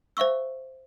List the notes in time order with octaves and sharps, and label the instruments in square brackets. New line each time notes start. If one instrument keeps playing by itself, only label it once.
[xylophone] C5 E5 F5 C#6 E6